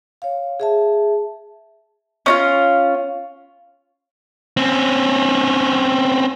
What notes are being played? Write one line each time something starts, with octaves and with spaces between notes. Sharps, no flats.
C#5 F5
G#4 E5 A5
C#4 D#4 F4
C4 C#4